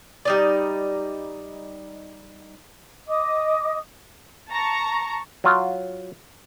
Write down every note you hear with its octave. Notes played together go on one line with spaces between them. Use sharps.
G3 D#4 D5
D#5 D6 D#6
A5 A#5 C#6
F#3 F4